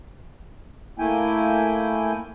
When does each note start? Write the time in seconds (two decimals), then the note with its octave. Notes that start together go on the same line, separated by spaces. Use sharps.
0.98 A3 A#3 E4 G5 G#5